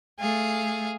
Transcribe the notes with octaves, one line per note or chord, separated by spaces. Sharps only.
A3 G#4 F5